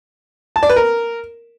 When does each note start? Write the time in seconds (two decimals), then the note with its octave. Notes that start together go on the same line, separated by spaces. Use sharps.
0.56 A5
0.63 D5
0.70 B4
0.76 A#4